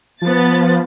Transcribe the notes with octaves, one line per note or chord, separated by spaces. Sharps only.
F3 B3 A6